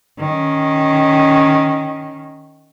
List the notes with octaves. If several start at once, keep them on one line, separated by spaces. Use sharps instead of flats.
D#3 C#4